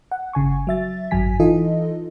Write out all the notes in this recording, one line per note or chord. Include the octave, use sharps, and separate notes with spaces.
F#5
G1 C#3 G#5 C#6
F#3 E5 A6
G#1 F#2 F#3 G#5 B6
E3 D#4 F4 A4 D#5